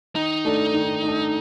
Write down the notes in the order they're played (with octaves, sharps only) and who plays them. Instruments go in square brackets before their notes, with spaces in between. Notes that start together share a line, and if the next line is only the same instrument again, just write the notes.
[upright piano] D#3 [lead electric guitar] D#4
[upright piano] A3 D4 A4
D#3
A3 D4 A4